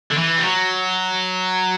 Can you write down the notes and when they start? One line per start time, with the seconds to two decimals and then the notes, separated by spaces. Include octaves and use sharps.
0.11 D3
0.17 E3
0.38 G3
0.44 F#3